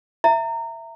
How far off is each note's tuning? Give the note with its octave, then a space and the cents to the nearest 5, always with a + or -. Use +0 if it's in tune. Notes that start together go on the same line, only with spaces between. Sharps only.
E5 +5 A#5 -20